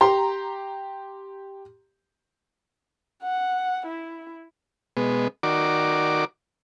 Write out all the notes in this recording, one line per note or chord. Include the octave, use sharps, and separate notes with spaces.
G4 A#5 C6
F#5
E4
B2 G#3 B3
D#3 F#4 A#4 D5 D6